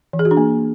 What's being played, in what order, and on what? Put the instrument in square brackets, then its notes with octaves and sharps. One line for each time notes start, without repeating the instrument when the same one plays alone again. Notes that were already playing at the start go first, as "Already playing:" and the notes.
[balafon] E3
G#4
F#4
D4
A#3